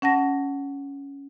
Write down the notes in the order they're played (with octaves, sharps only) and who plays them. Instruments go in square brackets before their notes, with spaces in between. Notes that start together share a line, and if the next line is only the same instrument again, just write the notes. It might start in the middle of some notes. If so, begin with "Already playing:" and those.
[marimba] C#4 F#5 A5 A#6